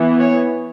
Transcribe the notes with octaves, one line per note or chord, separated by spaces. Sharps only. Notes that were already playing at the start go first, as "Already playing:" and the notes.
Already playing: E3 B3
C#5